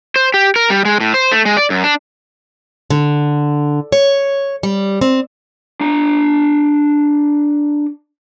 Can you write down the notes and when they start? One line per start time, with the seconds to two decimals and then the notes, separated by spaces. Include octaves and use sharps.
0.16 C5
0.34 G4
0.56 A#4
0.70 G3
0.85 G#3
1.00 A2
1.14 C5
1.32 A3
1.46 G#3
1.57 D5
1.70 F#2
1.84 D4
2.90 D3
3.92 C#5
4.63 G3
5.01 C4
5.81 D4 A#5